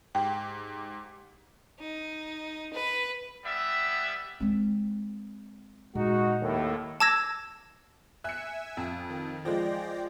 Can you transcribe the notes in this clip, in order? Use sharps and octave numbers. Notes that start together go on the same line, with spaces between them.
G#2 G4 G5
D#4
B4
G3 B3 E5
G#3 C4
A#2 G#3 D#4 F#4
D#2 A2
A5 D6 E6 G#6 A#6
E5 G#5 E6 F#6 C#7
F2
D#3
F3 G#3 D5 G5 A#6